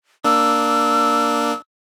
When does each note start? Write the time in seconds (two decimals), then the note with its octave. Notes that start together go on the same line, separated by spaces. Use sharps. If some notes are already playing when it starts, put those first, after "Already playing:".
0.25 A#3 D4 E6